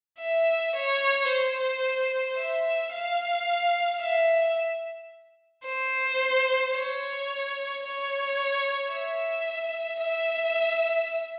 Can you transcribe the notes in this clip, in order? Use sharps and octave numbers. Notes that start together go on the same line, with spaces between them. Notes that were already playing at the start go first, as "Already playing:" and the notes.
E5
C#5
C5
E5
F5
E5
C5
C#5
C#5
E5
E5